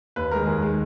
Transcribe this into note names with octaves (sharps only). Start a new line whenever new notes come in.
D#2 B4
D#3 G#3 A#4
D#2 G#4
D#3 G#3